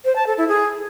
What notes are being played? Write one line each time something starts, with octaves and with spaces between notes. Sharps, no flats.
C5
A5
A4
E4
G#4